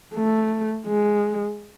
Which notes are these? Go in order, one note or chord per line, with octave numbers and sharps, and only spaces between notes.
A3
G#3